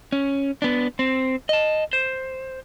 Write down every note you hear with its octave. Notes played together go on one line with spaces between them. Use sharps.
C#4
B3 D4
C4
D#5 A5
C5